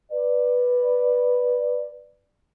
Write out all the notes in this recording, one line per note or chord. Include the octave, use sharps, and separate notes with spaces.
B4 D5